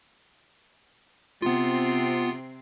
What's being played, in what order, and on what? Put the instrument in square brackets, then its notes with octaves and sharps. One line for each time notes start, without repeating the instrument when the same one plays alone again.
[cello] C3 C4 [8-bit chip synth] B3 F4